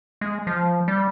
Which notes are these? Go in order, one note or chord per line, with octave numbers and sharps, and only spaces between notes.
G#3
F3
G3